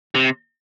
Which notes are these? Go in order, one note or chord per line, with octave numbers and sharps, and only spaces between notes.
C3